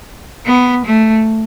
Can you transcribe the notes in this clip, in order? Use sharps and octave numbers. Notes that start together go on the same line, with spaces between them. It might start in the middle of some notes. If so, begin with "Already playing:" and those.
B3
A3